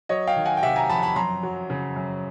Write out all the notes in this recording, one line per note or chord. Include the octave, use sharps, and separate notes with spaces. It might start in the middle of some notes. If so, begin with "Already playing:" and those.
F#3 C#5 D#5
F5 G5
D#3
F#5 G#5
G5
C3 E5 F#5
G#5 A#5
F2 A5 B5
A5 B5
F#2 A#5 C6
F#3
C#3
F#2